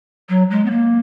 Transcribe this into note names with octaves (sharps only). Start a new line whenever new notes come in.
F#3
G#3
B3
A#3